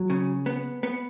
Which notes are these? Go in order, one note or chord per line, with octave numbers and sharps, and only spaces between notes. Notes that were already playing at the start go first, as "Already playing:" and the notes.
Already playing: F#3
C#3
B3
B3